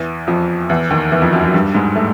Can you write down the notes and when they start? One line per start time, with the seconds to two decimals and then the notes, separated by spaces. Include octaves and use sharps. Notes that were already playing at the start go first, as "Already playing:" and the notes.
Already playing: E2 E3
0.27 F2 F3
0.70 E2 E3
0.90 D#2 D#3
1.12 E2 E3
1.22 F2 F3
1.33 F#2 F#3
1.43 F#2 F#3
1.54 G2 G3
1.74 G#2 G#3
1.95 A2 A3